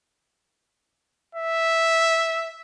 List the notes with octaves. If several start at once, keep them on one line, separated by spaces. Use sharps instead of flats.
E5